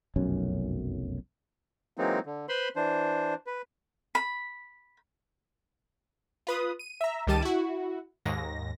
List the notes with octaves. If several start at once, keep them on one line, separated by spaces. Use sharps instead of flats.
F1 B1 F#2 C#4
E3 F#3 G#3 A#3 C4 D#4
D3
B4 C5 B5 C6
E3 D4 C5
B4
B5
F4 B4 D#6
D#7
E5 A#5
C#2 D#3 G3 G4 A5 D#7
E4 F#4
D#2 G#2 A#6